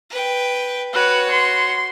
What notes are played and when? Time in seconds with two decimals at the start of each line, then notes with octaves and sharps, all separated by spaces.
0.10 B4 G5
0.93 F#4 B4 C#5
1.31 C6